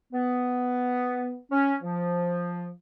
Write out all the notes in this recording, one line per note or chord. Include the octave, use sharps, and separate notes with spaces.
B3
C#4
F3